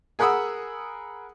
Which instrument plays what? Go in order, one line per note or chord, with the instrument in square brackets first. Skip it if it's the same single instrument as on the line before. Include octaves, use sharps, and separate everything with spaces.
[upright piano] G#4 A#4 F#5 B5 D#6 E6